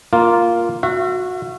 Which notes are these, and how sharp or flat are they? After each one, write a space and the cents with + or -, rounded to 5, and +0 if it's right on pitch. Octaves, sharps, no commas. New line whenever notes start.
A#3 +0 F4 +0
F#4 -20 E5 +40